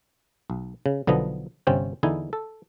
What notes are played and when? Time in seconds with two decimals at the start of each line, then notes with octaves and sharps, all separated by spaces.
0.50 B1
0.86 C#3
1.07 B1 D3 F3 B3 D#5
1.67 G1 C3 C4 C#4 G5
2.03 E2 D3 D#4 E4 G#5
2.33 A4